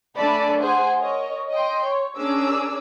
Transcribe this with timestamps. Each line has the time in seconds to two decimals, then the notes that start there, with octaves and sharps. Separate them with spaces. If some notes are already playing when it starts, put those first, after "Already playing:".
0.17 A3 D4 A4 D5 G#5 B5
0.59 G#4 C5 F#5 G#5
1.00 A#4 C#5 D#5
1.52 D#5 G5 C6
1.83 C#5
2.17 C#4 D4 G#4 A#4 D6 E6